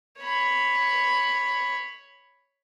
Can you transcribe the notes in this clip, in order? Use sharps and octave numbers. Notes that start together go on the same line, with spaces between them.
C#5 B5